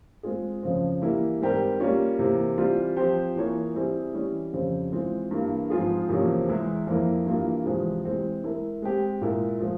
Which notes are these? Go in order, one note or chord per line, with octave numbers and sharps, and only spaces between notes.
G#3 C4 F4 G#4
F2 C#3 F3 C4
E3 G3 A#3 E4
G#2 G3 C4 G4 A#4
G3 A#3 C#4 F4
C3 E3 A#3
E3 G3 C4 F4
F3 C4 G4 C5
E3 A#3 F4 G#4 C#5
G3 C4 E4 G#4
E3 G3 C#4
F2 C#3 G3 C4
E3 G#3 C4 F4
G2 E3 A#3
G#2 F3 C4 F4 G#4
E2 C3 F3 A#3 C#4
E2 E3 G#3 E4
F2 E3 A#3 E4
G2 E3 A#3 F4
E2 C3 F3 G#3
E3 G#3 C4 G4
G#3 E4 A#4
G#3 C4 G4
A#2 G#3 E4 A#4
F3 G#3